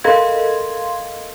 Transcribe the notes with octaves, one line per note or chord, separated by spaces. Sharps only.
A4 A#4 D#5 F5 C6 G#6